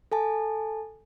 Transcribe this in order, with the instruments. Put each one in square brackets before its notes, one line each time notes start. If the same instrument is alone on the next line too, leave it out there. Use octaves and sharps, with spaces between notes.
[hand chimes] A4 G#5 A5